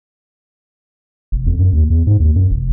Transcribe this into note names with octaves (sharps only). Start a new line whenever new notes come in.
F1
F2
F#2
D#2
E2
G#2
D#2
F#2
F1